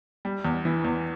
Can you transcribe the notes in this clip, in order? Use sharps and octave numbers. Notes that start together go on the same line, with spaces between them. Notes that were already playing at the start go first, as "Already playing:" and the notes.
G3
E2
E3
E2